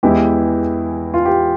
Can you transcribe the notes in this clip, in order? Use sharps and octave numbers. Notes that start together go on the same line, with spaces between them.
E2 E3 G#3 E4 G4
F4
G4